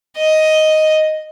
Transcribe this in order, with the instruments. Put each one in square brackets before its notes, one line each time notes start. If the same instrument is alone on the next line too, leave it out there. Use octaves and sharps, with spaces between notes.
[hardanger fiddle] D#5